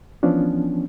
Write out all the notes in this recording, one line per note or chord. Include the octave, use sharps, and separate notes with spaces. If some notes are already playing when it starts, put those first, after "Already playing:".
E3 F3 B3 C#4 D4